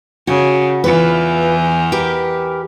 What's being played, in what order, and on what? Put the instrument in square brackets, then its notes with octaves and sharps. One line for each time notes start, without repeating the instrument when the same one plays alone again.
[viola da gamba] C#3 [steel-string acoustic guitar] F#4
[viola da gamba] E2 E3 [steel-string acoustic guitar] F4 B4
[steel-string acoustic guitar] G4 A#4 B4